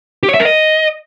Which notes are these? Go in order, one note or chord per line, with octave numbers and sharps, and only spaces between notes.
G4
C#5
E5
A#4
D#5